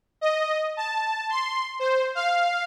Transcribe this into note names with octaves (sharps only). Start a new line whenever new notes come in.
D#5
A5
C6
C5
F5